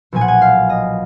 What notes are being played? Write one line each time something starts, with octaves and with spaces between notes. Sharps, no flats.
B1 A#2 F3 G#5
F#5
G#5
F5
D#5